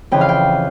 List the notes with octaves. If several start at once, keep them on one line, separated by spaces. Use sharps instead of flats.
F2 C#3 E3 G5
F5
G5